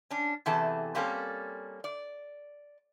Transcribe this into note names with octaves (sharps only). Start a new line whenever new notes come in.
C#4 D4
E2 C3 E3 G#4 A4 A5
G3 A#3 C4 C#4 F#4 A4
D5